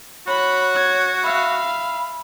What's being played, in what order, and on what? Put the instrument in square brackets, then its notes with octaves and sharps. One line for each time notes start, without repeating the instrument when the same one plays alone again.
[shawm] F#4 [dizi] C#5 [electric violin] B5
[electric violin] G#6
[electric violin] E5 F5 [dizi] B5